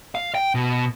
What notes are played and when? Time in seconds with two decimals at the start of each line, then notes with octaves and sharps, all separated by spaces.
0.15 F5
0.35 G5
0.55 B2